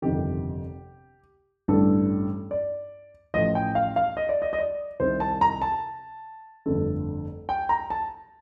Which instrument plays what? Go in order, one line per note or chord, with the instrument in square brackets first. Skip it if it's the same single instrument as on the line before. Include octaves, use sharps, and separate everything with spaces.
[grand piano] G1 F2 C3 D#3 G4
A1 G2 D3 G3 A4
D5
A1 A2 F3 D#5
G5
F5
F5
D#5
D5
D#5
D#5
D5
C2 C3 D#3 C5
A5
A#5
A5
G1 F2 D3 A3
G5
A#5
A5